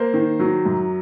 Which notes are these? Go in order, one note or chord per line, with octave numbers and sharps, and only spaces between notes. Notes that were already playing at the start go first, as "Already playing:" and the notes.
Already playing: A#3 C5
D#3
F#3
F#2